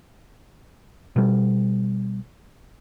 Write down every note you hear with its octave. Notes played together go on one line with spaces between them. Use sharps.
B2 G3